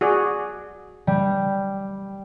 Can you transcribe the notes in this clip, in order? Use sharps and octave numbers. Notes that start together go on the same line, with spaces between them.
F#4 G#4 D5
G3